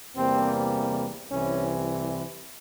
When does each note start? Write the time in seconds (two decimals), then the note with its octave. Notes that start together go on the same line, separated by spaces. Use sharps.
0.16 E2 C3 E3 G3 A#3 C4
1.31 C2 C3 E3 C#4